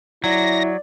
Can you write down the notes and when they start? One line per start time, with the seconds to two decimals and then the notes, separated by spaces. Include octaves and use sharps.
0.24 F#3 E4 D5 A#6